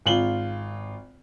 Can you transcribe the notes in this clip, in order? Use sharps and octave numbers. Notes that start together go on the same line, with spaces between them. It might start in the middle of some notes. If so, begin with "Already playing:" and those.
G#1 F4 F#7 G7